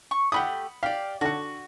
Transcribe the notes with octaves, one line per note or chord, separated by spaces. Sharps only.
C#6
A3 F#4 G4 F#5 B5 D#6
G4 D5 F5
D3 F#4 F#5